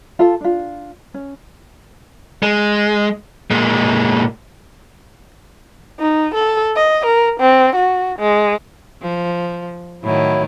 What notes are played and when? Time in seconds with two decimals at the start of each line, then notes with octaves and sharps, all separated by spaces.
0.19 F4 A4 F5 A5
0.41 D4 F4
1.14 C#4
2.43 G#3
3.51 A#2 G#3
6.00 D#4
6.34 A4
6.76 D#5
7.05 A#4
7.40 C4
7.76 F#4
8.18 G#3
9.02 F3
10.03 A2 D#3 F#3 E4